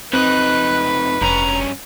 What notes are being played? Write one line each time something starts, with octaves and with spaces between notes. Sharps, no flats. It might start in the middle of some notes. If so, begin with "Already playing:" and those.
F2 C4 D#4 B4 F#6
F1 G2 C#4 A#5